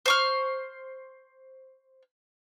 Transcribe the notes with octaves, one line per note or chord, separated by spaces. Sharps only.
C5 C#6 F6